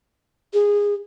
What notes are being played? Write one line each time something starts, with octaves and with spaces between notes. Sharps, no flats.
G#4